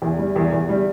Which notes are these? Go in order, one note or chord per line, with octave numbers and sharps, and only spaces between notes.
E2
G3
E2
E2
G3